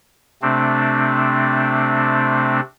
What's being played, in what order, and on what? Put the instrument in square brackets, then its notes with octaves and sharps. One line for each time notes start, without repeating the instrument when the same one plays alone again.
[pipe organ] C3 A3 C4 D4